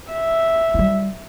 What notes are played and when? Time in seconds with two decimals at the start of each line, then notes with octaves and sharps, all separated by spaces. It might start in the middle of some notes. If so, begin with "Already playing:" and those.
0.12 E5
0.74 G3 E4